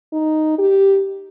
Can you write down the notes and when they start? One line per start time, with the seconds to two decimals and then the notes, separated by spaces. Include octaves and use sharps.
0.13 D#4
0.58 G4